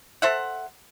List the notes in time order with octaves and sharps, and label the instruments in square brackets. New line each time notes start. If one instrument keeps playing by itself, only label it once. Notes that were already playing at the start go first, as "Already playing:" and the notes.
[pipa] A4 C5 E5 F#5